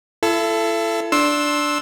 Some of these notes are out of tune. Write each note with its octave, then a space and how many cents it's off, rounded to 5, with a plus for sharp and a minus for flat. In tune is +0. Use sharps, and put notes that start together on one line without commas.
E4 +40 A4 +0
D4 +0 C6 +15 E6 -5